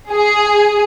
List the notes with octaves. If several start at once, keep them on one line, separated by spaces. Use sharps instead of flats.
G#4